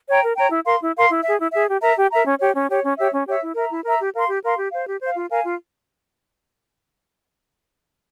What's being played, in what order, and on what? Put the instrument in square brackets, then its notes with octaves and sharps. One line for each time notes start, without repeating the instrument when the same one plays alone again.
[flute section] C#5 G5 A#5
A#4
C#5 G5 A#5
E4
A#4 F5 C6
E4
A#4 F5 C6
E4
G#4 E5
E4
G#4 E5
G4
A#4 E5 A#5
G4
A#4 E5 A#5
C#4
G4 C#5
C#4
G4 C#5
C#4
G4 C#5 E5
C#4
G4 C#5 E5
E4
A#4 E5 A#5
E4
A#4 E5 A#5
G4
A#4 F5 C6
G4
A#4 F5 C6
G4
C5 F5
G4
C5 F5
F4
A#4 F5 G#5
F4